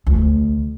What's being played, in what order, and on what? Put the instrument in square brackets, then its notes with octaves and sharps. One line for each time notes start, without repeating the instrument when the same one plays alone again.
[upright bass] D2